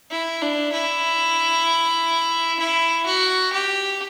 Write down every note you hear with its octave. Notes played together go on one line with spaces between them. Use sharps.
E4
D4
E4
E4
F#4
G4